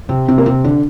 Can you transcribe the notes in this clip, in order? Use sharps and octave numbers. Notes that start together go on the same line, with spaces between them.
C3 C4
C3 C4
A#3
C3 C4
D3 D4